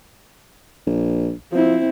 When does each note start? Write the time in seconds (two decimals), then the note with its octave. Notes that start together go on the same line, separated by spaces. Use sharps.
0.87 A#1
1.52 F3 C4 E4